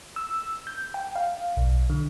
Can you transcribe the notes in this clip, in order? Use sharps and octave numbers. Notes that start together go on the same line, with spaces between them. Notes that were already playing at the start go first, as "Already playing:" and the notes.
E6
G6
G5
F5
B1
D3